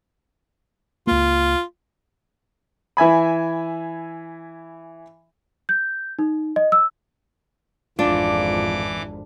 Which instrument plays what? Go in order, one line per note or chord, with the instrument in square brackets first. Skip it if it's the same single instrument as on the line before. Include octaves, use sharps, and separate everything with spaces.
[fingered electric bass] C#2 A#3 [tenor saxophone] F4
[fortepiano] E3 E5 G#5 B5
[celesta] G6
D#4
D#5
E6
[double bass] G#1 F2 [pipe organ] E3 D6 [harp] D4 [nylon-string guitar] F4